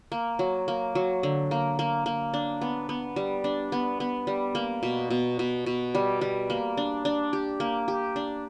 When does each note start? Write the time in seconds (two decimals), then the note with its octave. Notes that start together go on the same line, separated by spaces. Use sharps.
0.12 A#3
0.39 F#3
0.68 A#3
0.95 F#3
1.23 D3
1.51 A#3
1.79 A#3
2.06 A#3
2.34 D4
2.61 B3
2.89 B3
3.16 G3
3.44 D4
3.72 B3
4.00 B3
4.27 G3
4.55 A#3
4.83 B2
5.10 B2
5.39 B2
5.66 B2
5.95 G3
6.21 G3
6.50 A#3
6.77 D4
7.05 D4
7.33 G4
7.60 A#3
7.88 G4
8.16 D4